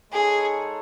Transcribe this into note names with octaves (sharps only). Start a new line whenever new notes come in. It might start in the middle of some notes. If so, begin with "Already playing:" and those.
G#3 D#4 G#4 A4 C#5